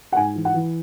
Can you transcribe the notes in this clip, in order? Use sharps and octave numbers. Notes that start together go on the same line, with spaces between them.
F#5
G#2 G#5
E3
F#5
E3